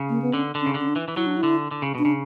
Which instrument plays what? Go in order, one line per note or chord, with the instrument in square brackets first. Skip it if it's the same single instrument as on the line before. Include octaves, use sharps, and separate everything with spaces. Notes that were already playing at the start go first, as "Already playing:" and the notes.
Already playing: [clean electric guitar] C#3
[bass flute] A#3
B3
[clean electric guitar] D3 [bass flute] C#4
[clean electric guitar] D3
[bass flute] C#4
[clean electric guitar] C#3
D3
[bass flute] C#4
D4
[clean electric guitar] E3
E3
[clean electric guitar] F#3 [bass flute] E4
[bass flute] D4
E4
[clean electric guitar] D3
D3
C#3
[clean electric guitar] B2 [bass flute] D4
[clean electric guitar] C#3